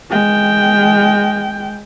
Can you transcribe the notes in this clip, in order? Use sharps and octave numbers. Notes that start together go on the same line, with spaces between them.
G#3 G5